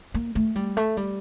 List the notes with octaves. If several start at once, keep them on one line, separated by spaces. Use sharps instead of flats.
A#3
A3
G3
A3
G3